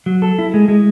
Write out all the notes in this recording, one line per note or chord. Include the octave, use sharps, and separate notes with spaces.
F#3
A4
E4
G#3
G#3